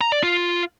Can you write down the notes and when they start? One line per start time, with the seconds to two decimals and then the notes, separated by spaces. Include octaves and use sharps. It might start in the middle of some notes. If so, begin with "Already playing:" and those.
0.01 A#5
0.12 D5
0.23 F4